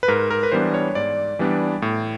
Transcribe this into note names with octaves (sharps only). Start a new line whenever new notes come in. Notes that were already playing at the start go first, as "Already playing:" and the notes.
B4
G#2 A#4
A#4
B4
E3 G3 B3 D4 C5
C#5
G#2 D5
E3 G3 B3 D4
A2